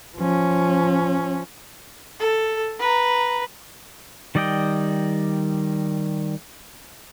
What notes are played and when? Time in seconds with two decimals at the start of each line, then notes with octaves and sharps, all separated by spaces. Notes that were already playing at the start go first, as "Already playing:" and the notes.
0.17 F3 C#4
2.20 A4
2.80 B4 A#5
4.35 D#3 G3 D5 D#5 G5